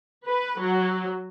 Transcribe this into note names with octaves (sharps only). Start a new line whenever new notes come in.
B4
F#3